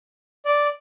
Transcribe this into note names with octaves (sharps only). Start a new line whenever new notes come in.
D5